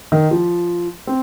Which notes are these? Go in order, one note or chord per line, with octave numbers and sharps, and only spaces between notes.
D#3
F3
C4